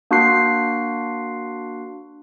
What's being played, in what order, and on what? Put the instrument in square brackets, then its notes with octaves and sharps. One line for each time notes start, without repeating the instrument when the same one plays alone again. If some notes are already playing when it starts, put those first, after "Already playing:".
[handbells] A#3 D4 F#4 C6 F#6 C7